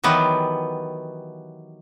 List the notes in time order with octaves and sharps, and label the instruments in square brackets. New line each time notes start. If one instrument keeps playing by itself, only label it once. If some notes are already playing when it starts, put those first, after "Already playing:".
[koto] D#3 E3 F#3 B3 G4